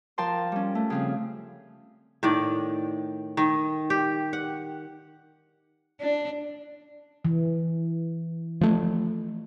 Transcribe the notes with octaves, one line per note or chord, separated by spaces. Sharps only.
F3 F4 A#4 G5 A5 C6
G3 C#4
A3
C#3 F3 C4
A2 D#3 D5
D#3
G4
F#5
D4
E3
F3 A3